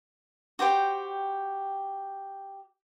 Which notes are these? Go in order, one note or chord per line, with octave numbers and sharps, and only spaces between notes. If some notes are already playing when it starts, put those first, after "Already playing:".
F#4 G4 C5 G5